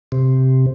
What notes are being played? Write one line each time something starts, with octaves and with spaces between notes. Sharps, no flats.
C3